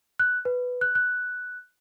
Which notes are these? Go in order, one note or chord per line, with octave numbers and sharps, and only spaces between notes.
F#6
B4
F#6
F#6